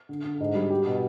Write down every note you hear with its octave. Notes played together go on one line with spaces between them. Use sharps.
D3
D3
G#2
G3
G4
B2